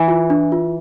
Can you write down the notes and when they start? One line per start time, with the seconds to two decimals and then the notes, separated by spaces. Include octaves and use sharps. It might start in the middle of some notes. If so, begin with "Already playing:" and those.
Already playing: E3
0.08 F4
0.30 D4
0.52 F4